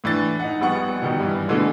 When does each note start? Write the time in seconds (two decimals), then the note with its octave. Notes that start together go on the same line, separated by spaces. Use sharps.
0.04 A2 E3 D4 A6
0.39 D#4 F#5
0.61 A#1 G3 B3 F#5 C#6
1.02 B2 D#3 G3
1.20 G2 E3
1.48 B2 D3 E3 G#3 A3